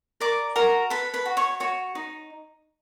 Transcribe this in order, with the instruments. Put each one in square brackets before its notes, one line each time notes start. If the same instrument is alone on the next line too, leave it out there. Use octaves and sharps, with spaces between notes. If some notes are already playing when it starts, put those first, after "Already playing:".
[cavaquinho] A#4 D5 D6
F#4 A#4 A#5
A4 B4 B5
B4 B5
F#4
C#5 C#6
F#4 C#5 C#6
D#4